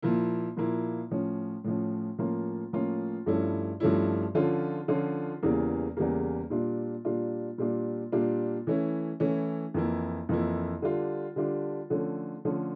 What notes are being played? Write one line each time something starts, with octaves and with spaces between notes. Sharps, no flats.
A#2 F3 A#3 E4
A#2 F3 A#3 E4
A2 F3 C#4
A2 F3 C#4
A2 F3 A#3 C#4 F4
A2 F3 A#3 C#4 F4
G2 F3 A3 C#4 E4
G2 F3 A3 C#4 E4
D3 F3 C#4 F4
D3 F3 C#4 F4
E2 C#3 E3 G3 A#3
E2 C#3 E3 G3 A#3
A#2 G3 D4 F4
A#2 G3 D4 F4
A#2 G3 D4 F4
A#2 G3 D4 F4
E3 A3 C#4 E4
E3 A3 C#4 E4
F2 E3 A#3 E4
F2 E3 A#3 E4
D3 G3 D4 F4
D3 G3 D4 F4
D3 F3 A3 C#4
D3 F3 A3 C#4